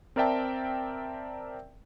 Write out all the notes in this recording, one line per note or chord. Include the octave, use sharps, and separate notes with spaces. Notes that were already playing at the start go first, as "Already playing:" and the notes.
C4 A#4 D5 E5 G5 A5